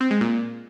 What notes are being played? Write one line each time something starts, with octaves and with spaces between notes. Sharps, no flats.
C4
G#3
A#2